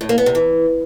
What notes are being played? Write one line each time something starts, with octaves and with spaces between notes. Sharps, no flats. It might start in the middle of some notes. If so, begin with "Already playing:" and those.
A2
A#3
B3
C3
E3